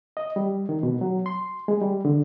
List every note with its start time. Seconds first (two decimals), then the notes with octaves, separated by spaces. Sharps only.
0.17 D#5
0.36 G3
0.69 D#3
0.83 B2
1.01 F#3
1.26 C6
1.68 G#3
1.82 G3
2.05 D3